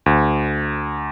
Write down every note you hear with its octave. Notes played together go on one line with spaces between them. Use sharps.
D2